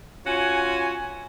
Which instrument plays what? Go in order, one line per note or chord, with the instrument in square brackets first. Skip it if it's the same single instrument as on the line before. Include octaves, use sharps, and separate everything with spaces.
[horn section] C#4 F4 F#4 G#5